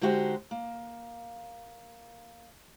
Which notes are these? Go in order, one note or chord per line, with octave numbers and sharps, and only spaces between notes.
D3 G#3 D#4 F#4 G4 C5
A#3